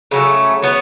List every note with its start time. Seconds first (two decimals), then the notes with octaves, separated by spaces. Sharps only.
0.11 C#3 F#3 A3
0.62 B3 F#4 C#5